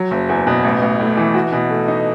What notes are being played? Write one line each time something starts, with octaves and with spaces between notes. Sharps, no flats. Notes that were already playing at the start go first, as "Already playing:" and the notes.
Already playing: F#3
F#1
E2
B2
A1
A1
A2
E3
F#4
B2
A3
D#4